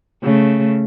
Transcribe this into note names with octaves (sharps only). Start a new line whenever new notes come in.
C#3 A3